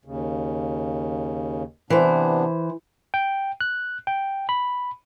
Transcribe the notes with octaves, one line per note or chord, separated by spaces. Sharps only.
D#2 C#3
C3 E3 B3 D4 C5
G5
F#6
G5
B5